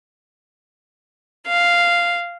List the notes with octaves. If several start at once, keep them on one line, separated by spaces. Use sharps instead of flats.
F5